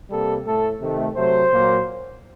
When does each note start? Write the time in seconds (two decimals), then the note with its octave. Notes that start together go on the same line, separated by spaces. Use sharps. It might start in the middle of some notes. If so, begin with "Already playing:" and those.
0.10 C3 G3 A#3 A4
0.45 A2 A3 A4
0.80 C3 D#3 A3
1.15 C3 F#3 A3 C5
1.51 A#2 F#3 A#3